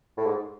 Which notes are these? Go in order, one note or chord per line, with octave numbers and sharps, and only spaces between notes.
A2
G#2